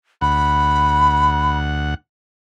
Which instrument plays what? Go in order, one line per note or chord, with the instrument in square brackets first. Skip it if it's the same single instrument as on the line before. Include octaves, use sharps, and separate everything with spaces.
[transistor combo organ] D2 F#5 [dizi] B5